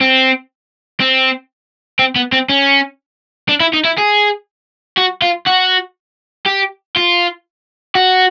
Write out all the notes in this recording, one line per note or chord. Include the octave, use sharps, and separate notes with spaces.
C4
C4
C4
B3
C4
C#4
D4
E4
D#4
E4
G#4
F#4
F4
F#4
G4
F4
F#4